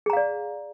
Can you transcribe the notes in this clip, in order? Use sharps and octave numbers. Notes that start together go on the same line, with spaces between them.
G#4 D5 F5 A#5